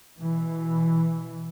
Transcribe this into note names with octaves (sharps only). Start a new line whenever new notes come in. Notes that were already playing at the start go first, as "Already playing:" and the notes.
B2 E3